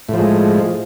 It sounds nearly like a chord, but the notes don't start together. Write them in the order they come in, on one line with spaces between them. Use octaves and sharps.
A2 F3 G#3